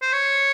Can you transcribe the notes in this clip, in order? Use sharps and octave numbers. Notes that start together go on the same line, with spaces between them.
C5
C#5